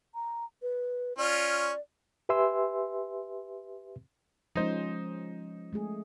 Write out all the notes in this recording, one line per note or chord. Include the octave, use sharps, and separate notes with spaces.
A#5
B4
C#4 F4 D5
G4 B4 E5 G#5 C6 E6
F3 G#3 C#4 D#4 C5
G#3 A3 G#4